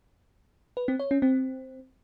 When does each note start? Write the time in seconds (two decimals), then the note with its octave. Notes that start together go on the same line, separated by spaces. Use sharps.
0.77 B4
0.88 C4
1.00 C#5
1.11 C#4
1.22 C4